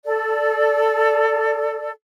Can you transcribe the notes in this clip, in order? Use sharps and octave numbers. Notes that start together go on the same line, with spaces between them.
A4 D5